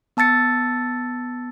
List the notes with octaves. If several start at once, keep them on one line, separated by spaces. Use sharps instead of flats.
B3 A5 E6 A6 C#7